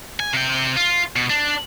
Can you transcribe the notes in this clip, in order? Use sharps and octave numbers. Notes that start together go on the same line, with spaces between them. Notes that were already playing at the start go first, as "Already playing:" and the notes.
G#5
C3 G5
F4
B2
D4